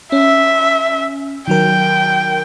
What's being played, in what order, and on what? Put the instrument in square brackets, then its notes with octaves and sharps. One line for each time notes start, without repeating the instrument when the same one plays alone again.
[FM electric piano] C#4 [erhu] E5
[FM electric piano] D#3 F#3 A#4 [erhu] G5